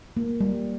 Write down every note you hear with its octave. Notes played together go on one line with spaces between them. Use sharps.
A#3
G3